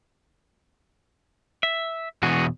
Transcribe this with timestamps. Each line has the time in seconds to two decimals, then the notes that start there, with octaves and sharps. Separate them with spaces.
1.63 E5
2.23 E2 B2 E3 F#4 G#4